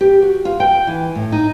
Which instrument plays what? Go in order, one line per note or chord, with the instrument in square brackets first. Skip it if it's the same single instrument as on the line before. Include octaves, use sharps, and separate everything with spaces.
[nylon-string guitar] G4
F#4
F4
G5
E3
A2
D#4